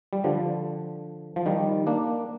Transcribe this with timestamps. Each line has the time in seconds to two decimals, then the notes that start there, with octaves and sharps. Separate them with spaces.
0.13 G3
0.24 D3 F3
1.36 F3
1.46 D#3 G3
1.87 A#3 D4